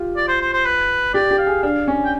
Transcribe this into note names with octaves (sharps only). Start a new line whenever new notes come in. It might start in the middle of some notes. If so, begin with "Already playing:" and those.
Already playing: F4 G4
D5
C5
C5
C5
B4
G4 D5
G4
F5
G#4
D4 F5
C#4
G5